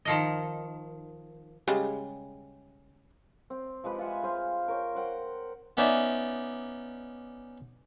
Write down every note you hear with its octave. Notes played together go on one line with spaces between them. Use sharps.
D#3 F3 D#5
C#3 G3 G#3
C4
F3 G#3 G4 B4
F4 E5 F#5 G#5
G#3 C5 F5
A#4 C#5 G5
C5 F#5 G5
B3 C#4 D#4 D5 E5